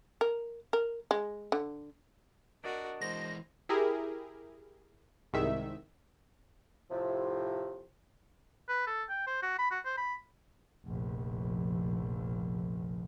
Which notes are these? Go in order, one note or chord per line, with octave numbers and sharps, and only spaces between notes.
A#4
A#4
G#3
D3
D4 F#4 A#4 D5 D#5
E3 G#3 C5 A#6
E4 G4 G#4 A#4
C2 G#2 D#3 E5
A2 C3 F3
B4
A4
G5
C5
F#4
B5
F#4
C5
B5
F1 A#1